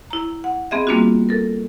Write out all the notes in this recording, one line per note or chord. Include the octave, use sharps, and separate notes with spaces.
E4 A#5
F#5
B3 C4 G#4 D#5 E5
G3 A#3 C4 D4 F4 F#4
A4 A#4